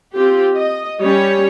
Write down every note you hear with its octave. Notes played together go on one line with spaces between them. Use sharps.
C4 F4 G4
D#5
G3 C#4 C#5